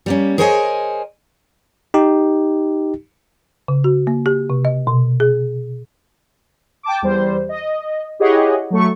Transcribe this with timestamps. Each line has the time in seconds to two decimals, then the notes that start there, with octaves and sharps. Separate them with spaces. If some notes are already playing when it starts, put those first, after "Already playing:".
0.06 G3 A#3 C#4
0.38 G#4 A#4 C5 C#5 D#5 G#5
1.94 D#4 G4
3.68 C#3
3.84 F#4
4.07 A#3
4.26 G4
4.50 C3
4.65 D#5
4.87 B2
5.20 G#4
6.83 G5 A5 D6
7.02 E2 G3 C5
7.49 D#5
8.19 E4 G4 G#4 C#5 D#5 F#5
8.70 F#3 A3 C#6